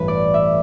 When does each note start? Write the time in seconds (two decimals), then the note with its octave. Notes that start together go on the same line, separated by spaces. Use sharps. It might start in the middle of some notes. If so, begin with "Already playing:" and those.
Already playing: A1 G2 E3 B4
0.08 D5
0.34 E5